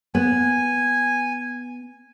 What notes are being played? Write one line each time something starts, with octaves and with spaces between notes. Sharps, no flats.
B3 G#5